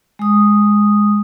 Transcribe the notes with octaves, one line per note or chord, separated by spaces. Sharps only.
G#3 D#6